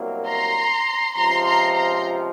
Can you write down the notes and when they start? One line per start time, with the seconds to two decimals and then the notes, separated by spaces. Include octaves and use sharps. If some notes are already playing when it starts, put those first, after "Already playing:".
Already playing: C2 B2 F#3 A#3
0.28 A#5 C6
1.16 C#2 C3 F3 A#5 C6
1.46 A#5 C6
1.75 A#5 C6